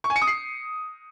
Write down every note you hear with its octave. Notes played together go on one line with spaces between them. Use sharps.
C#6
G#5
C#7
D#6
C7